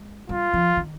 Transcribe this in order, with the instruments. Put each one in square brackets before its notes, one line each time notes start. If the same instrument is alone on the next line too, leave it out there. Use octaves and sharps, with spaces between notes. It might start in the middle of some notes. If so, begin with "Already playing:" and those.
Already playing: [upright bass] G#3
[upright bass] G3 [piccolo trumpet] F4
[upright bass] F3
D#3